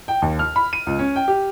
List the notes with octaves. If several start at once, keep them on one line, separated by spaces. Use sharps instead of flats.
G5
D#2
F6
B5
D#7
C#2
C#4
G5
G4